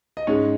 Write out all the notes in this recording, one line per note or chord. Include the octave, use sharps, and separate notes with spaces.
D#5
G#2 G#3 C#4 C#5